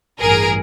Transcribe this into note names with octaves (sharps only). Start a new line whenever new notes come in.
A1 G2 E3 G#4 A#4